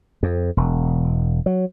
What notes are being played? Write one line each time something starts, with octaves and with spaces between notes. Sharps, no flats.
F2
E1
F#3